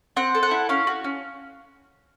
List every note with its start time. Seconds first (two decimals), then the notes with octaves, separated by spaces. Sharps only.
0.16 C4 F#5
0.34 A4
0.43 F#5
0.51 E4
0.69 C#4 F5
0.87 F#4
1.04 C#4